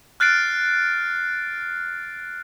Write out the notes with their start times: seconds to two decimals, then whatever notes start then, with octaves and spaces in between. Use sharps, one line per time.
0.20 F6 F#6 A6 C7 D7